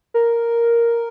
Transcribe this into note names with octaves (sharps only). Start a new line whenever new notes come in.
A#4